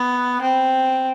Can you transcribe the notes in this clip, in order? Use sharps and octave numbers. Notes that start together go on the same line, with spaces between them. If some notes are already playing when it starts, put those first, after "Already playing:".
Already playing: B3
C4